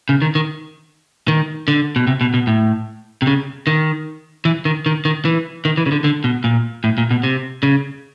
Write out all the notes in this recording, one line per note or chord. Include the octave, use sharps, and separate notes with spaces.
C#3
D#3
D#3
D#3
D3
B2
C3
B2
B2
A2
C3
C#3
D#3
E3
D#3
D#3
D#3
E3
D#3
E3
C#3
D3
D3
B2
A#2
A2
A#2
B2
C3
C#3